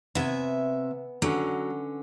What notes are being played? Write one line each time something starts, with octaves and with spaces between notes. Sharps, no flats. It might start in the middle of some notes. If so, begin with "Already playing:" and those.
C3 B3 E5 G#5
D3 F#3 C#4